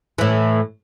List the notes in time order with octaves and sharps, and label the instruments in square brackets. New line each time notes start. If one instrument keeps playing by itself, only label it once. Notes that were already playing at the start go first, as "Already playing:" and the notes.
[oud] A2 E3